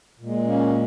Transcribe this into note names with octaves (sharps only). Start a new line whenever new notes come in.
A#2 G#3
A#3 C#4